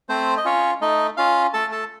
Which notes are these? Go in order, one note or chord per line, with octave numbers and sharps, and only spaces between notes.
A3 C4 C5
D#5
C#4 F4 C#5
A3 D#4 D#5
C#4 F4 F5
A3 A4 A5
A4 A5